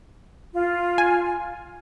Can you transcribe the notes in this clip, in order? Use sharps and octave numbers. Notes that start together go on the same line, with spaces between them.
F4
G#5